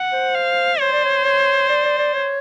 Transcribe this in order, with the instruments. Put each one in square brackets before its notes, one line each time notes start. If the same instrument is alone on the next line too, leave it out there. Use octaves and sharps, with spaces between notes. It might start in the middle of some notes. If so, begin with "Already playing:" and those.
Already playing: [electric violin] F#5
[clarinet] C5
[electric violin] F5
[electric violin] C5 [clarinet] C#5
[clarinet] D5
C#5
C#5
D5
D5
D5
C#5